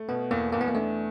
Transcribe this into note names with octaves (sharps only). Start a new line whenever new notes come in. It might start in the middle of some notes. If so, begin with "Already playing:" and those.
Already playing: A3
B2 B3
E2 A#3
E2 A#3
B3
A#3
A3 D4